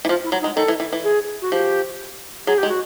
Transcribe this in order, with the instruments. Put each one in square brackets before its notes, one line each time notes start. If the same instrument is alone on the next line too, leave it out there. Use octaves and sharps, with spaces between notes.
[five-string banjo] E3
[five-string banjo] F3 [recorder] F4
[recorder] E4
[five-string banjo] F#3
[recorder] D#4
[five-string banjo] G#3
[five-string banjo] D#3 [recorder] A4
[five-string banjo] E3
E3
E3
[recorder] G#4
F#4
[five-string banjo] F3 [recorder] G4
[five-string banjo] F#3 [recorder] G#4
[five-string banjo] G#3 [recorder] G4
[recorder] F#4